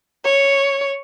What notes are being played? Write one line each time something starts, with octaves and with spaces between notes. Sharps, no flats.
C#5